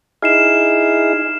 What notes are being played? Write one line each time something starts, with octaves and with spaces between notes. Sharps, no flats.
D#4 E4 G#4 F6 C7 E7